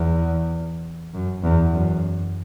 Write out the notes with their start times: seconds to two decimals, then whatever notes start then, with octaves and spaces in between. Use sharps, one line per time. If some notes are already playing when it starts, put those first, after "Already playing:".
Already playing: E2
1.13 F#2
1.43 E2
1.73 F#2